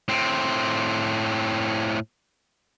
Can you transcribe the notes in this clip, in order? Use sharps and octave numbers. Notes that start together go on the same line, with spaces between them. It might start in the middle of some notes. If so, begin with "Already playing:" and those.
A2 C4